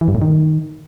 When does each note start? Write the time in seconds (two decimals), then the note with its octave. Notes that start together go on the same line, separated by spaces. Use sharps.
0.01 E3
0.08 G2
0.15 A2
0.22 D#3